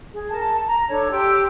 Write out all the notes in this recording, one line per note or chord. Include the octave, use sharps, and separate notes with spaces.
G#4
A#4 A5
A#5
D4 A4 C#5
G4 G5 C6 E6